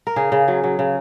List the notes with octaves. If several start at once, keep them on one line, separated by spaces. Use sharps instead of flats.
A#4
C#3 G#4
C#3
F#3
F#3
C#3